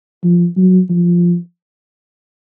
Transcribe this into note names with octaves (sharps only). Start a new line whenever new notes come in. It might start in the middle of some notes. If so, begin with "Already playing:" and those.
F3
F#3
F3